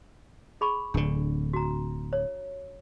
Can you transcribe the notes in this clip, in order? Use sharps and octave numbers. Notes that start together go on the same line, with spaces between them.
G#4 B5 C#6
D1 D3 D4
F#4 A#5
C#5